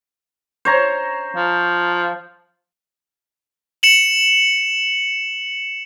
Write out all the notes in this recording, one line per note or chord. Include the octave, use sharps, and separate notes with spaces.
C5 C#5 A#5
F3
C#7 E7 F#7